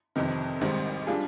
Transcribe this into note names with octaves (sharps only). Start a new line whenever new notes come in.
G1 F2 C3 D#3
G#1 G#2 D#3 G3 C4
G3 D4 F4 G#4